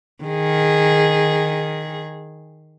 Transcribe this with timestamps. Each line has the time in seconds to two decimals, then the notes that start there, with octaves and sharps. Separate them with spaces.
0.24 D#3 G#4